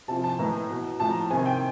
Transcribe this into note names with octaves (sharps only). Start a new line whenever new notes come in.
C3 F3 A5
A5
A2 E3 A#5
B2
A2 F3 A5
A#5
C3 D#3 G#5
G5